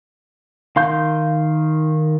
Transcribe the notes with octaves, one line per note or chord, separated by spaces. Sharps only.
D#3 F5 C6 G6